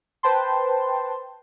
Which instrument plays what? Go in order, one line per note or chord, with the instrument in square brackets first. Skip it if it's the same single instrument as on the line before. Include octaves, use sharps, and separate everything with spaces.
[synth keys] B4 C5 G5 A5 C6